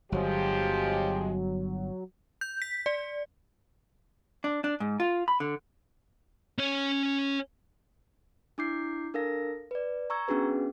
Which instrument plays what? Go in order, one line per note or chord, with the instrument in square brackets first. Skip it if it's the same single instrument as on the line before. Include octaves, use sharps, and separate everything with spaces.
[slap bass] G1 [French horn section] F3 G#3 G4 [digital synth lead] F#3
[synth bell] G6
B6
D5
[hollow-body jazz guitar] D4
D4
G#2
F4
B5
D3
[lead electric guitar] C#4 C#5
[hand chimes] D4 E4 D6 G6 C7
D4 A4 A#4 F5 A#6
B4 D5
A#5 C#6 E6 G#6
B3 C#4 D4 F#4 G#4 B4